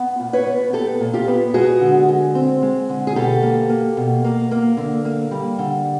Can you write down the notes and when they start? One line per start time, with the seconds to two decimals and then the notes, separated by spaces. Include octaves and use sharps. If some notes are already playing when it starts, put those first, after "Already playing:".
Already playing: B3
0.20 A#2
0.33 B4 C#5
0.47 B3
0.73 B3 G4 A4
1.01 A#2
1.14 F4 G4
1.28 B3
1.54 G#3 F#4 G#4
1.81 D3
2.09 G#3
2.35 C4
2.62 G#3
2.89 D3
3.07 G#4
3.16 B2 G4 A4
3.43 A#3
3.69 A#3
3.97 B2
4.24 A#3
4.51 A#3
4.77 D3
5.05 A#3
5.31 G3
5.59 D3